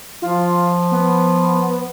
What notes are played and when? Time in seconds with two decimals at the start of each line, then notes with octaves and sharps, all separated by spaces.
0.22 F3 F4
0.92 B3